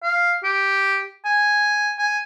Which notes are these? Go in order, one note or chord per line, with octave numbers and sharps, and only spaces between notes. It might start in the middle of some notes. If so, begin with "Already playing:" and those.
F5
G4
G#5
G#5